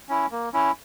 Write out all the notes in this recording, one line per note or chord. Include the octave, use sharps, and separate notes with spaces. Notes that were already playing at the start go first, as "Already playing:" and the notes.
C#4 E4
A#3
C#4 E4